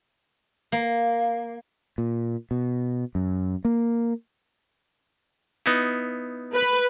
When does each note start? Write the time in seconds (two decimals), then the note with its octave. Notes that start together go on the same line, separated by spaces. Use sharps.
0.72 A#3
1.98 A#2
2.51 B2
3.15 F#2
3.65 A#3
5.66 B3 D#4 E4
6.53 B4